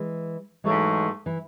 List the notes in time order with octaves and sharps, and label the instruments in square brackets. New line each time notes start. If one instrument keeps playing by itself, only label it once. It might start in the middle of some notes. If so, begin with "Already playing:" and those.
Already playing: [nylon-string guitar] E3 G#3
[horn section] G#2 F#3 A3 [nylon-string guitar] E3 G#3
[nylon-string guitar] E3